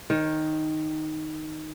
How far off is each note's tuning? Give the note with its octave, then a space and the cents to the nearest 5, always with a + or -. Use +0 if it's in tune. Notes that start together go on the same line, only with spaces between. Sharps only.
D#3 +0 C#5 -35